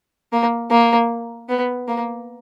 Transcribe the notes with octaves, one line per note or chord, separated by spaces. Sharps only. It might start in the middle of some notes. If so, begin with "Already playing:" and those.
A#3
A#3
B3
A#3